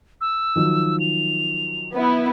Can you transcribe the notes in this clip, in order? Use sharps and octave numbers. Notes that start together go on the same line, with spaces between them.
E6
D#3 F3 F#3
F7
B3 E4